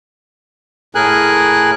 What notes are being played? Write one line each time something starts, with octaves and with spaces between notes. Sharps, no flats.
A2 G#4 A#4 G#5 F#6